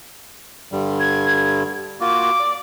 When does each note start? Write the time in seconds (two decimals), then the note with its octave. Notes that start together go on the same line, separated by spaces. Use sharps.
0.72 G2 D3 G3
1.00 G#6
2.01 A#3 F4 F#4 D6
2.40 D5